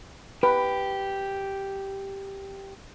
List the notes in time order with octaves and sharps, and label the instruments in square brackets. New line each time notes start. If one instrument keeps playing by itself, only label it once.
[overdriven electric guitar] G4 [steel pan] B4